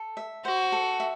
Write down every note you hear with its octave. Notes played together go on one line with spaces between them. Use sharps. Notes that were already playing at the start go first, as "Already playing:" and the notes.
Already playing: A4
E5
F#4 C5
A4
E5